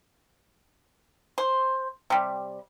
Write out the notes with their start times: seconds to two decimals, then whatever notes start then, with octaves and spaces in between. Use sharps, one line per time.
1.38 C5
2.10 C3 G3